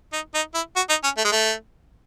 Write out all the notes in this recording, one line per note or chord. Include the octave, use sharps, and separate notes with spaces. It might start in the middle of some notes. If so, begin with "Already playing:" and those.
D#4
D#4
E4
F#4
D#4
C#4
A3
G#3
A3